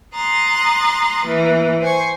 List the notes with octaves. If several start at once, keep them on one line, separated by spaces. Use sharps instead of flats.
A#5 C6 D#6 F#6 A6
E3 A#3
C5 G#5 C#6